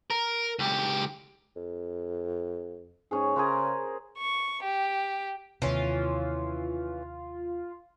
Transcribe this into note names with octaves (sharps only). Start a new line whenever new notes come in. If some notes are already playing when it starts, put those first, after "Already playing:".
A#4
C#2 G4
F2
G#2 C#4 G#4
C#3 G#4 A#4 C5
C#6
G4
D#2 C3 E3 C#4 F4